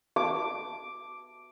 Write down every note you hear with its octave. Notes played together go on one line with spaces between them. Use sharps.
D6